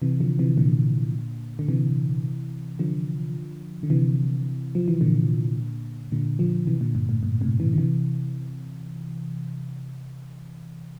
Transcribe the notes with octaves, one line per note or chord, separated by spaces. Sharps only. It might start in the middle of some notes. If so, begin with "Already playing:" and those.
C3 E3
D3 F3
C3 E3
A#2 D3
D3
C3 E3
D3 F3
D3
C3 E3
F3
E3
A#2 D3
A#2 D3
D3 F3
C3 E3
A#2 D3
G2 A#2
A2
G2 A#2
A2 C3
C3 E3
D3
C3 E3